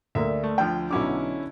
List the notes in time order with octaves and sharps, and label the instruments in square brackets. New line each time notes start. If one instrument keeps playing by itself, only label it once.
[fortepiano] D2 A#3 [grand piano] E5
[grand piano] A3
[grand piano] D2 F3 [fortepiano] G5
[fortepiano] B1 F#3 D6 [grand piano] D3 C#4 E4